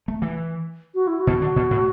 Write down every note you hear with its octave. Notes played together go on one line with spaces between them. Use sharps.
A3
E3
F#4
E4
F#4
B2
D3
B2
A2